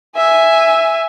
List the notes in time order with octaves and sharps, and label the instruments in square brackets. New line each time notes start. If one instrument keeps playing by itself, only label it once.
[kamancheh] E5 G#5